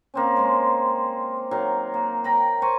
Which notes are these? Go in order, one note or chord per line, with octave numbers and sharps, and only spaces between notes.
A#3 C4 C#4
G#3 C6
D#3 F#3 F5
A#3
A#4 G5 A#5 B5
C5 G#5 A#5 C#6